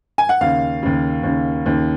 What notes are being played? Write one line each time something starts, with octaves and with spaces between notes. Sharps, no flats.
G#5
F#5
D#2 C#3 F5
D#2 C#3
D#2 C#3
D#2 C#3